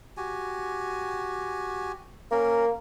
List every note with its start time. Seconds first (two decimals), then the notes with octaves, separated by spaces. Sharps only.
0.17 F#4 G4 G#5
2.31 A#3 C#4 A#4